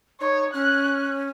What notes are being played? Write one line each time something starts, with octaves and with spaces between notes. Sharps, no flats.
D#4 C#5
C#4 F#6